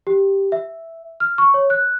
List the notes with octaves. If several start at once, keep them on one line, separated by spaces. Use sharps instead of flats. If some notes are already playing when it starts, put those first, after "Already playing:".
G4
E5
F6
C#6
C#5
F#6